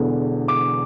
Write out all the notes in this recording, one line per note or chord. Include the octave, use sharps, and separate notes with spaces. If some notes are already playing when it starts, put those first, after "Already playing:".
Already playing: E1 E2 D3
D6